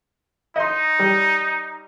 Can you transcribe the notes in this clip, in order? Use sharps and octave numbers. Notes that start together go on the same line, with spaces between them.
D#4 D#5 C6
G3